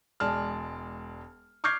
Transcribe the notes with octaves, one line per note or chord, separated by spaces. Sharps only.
E1 G#3 D5 A5 F6
C#6 D6 F6 G6 G#6 C7